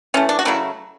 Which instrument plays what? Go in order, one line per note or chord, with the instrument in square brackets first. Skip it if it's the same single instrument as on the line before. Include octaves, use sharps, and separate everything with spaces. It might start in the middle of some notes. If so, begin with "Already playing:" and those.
[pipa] E3 A3 C#4
D4
F#4
C#3 F#3 A3 E4